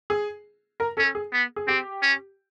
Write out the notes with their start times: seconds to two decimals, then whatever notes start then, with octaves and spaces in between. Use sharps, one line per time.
0.10 G#4
0.80 A#4
0.97 C#4 A4
1.15 G#4
1.33 B3
1.56 G#4
1.68 C4 G4
2.02 C#4